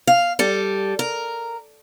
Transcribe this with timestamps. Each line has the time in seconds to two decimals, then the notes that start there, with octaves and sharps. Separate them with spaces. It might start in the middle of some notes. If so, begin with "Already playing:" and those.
0.07 F5
0.39 G3 A4
0.99 A#4